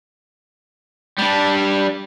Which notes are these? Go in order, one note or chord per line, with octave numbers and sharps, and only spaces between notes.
G3 D4